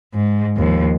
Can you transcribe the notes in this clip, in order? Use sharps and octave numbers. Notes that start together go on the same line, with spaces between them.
G#2
D#2 F3